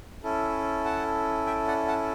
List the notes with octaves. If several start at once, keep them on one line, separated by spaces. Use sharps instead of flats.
C#4 E4 A4
F#5 A5
E5 G5
D5 F#5
F#5 A5